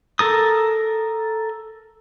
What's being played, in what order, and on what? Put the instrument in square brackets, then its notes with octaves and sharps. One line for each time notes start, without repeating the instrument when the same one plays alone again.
[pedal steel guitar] A4 A#4 D#6